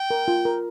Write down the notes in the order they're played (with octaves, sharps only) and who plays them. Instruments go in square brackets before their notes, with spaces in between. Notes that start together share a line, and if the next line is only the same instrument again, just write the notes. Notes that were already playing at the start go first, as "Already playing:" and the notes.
Already playing: [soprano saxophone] G5
[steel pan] A#4
F4
A#4